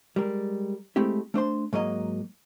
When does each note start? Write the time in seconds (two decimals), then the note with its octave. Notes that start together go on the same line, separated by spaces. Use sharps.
0.16 G3 G#3 A#4
0.96 G#3 A3 C4 E4 G4
1.34 A3 D4 C5 C6
1.73 G#2 F#3 A#3 D#5 A#5